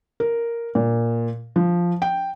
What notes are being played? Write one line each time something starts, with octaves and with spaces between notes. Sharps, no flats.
A#4
A#2
F3
G5